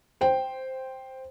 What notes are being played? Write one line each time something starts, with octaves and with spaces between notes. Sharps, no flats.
C5 G5